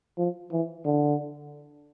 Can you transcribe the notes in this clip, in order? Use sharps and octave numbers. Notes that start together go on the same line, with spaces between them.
F3
E3
D3